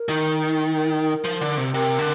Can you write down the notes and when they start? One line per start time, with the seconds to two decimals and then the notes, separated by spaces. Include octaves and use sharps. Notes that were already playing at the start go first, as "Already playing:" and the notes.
Already playing: A#4
0.09 D#3
0.75 A#4
1.24 F3
1.41 D3
1.58 C3
1.74 C3 A#4
1.99 D3